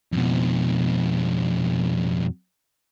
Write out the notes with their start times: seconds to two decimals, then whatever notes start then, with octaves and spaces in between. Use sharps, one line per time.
0.12 F2 B2